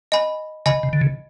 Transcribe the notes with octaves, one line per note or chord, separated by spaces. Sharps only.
D#5 G#5 B5
C#3 D#5 G#5 B5
C3
D3
C#3